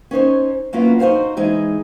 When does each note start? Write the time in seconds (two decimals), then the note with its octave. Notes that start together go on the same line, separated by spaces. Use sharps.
0.11 C#4 D#4 C5 C#5
0.73 F#3 A#3 B3 C#4 E4 F4
0.99 D#4 F#4 G#4 C5 F5
1.37 E3 G#3 D#4 G#4